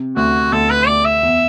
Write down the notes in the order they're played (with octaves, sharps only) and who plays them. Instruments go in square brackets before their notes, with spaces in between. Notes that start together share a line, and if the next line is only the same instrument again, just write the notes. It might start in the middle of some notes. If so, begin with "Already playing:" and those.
Already playing: [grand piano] C3
[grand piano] D2 [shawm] F#4
[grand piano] D2 [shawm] A4
[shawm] B4
[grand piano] D2 [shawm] D5
[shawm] E5
[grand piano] E2